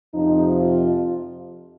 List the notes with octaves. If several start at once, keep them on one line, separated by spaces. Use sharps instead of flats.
F2 C3 F3 D#4
F4